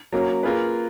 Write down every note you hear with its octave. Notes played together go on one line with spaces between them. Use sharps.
F#3 A#3 C#4
A#3 F4 G#4 B4